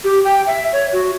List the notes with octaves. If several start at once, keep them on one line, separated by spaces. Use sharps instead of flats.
G4
G5
E5
C#5
F#4